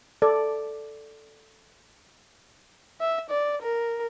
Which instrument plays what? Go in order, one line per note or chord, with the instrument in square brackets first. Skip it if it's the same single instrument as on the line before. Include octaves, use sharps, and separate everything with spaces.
[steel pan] A4 D5
[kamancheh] E5
D5
A#4